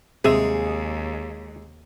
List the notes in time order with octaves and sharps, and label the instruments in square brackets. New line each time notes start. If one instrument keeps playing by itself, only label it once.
[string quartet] D#2 [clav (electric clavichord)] C3 E5 [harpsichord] G#3 [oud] G#4